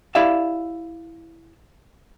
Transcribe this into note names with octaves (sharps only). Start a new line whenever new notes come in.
E4 G4 D5 E5 F5